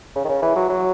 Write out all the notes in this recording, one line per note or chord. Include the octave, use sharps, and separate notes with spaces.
C#3
D#3
C#3
E3
F#3
F#3